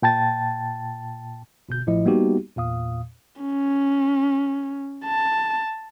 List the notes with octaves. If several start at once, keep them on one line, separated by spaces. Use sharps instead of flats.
A#2 G5 A5 A6
G1 B2 G6
A1 A2 F3 E4 D#5
G3 A#3 B3 D#4 F#4 G4
E2 A#2 F5 D#6
C#4
A5